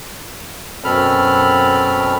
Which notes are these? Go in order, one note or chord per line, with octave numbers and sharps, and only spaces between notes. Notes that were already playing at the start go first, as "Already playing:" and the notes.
F#2 B2 C4 A4 B5 F6